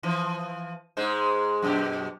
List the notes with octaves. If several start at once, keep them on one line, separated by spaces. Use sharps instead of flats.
E3 F3
G#2 G#3 C5
F#2 B2 G4